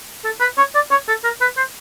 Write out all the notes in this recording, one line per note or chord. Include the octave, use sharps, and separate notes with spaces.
A4
B4
C#5
D5
C#5
A4
A#4
B4
C5